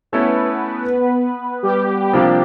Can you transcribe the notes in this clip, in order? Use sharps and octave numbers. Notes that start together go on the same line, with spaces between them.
A3 B3 C#4 E4 A4 B4 C#5
G3 G4
C3 F3 G3 A#3 D4 G4